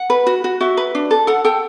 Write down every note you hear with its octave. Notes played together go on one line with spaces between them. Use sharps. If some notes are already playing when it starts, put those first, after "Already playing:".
Already playing: F#5
B4
F#4
F#4
F#4 E5
B4
D4
A4
A4 F#5
A4 G5